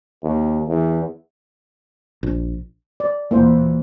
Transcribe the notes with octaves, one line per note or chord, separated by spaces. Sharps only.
D#2
E2
A#1
D5
D#2 A#2 E3 A#3 E4 C5